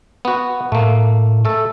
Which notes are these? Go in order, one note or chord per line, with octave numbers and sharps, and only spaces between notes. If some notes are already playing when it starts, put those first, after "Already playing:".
B3 F#4
A2 A3 A#3
A3 A4